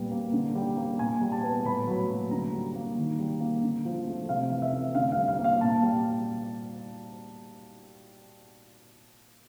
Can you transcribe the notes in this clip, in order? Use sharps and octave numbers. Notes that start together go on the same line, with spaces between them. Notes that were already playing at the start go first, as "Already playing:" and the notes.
Already playing: A#2 G3 B3
A#3
D3
G3
A#3
A#2 G#5
G3
A5
B3
A2 B5
F#3
A#3
D3 A#5
G3
A#3
D#3
G3
A#3
D3
F3
A3
C3 F5
E3
E5
A3
D3 F5
G3 F5
F5
A#3
F5
A#2 A5
G3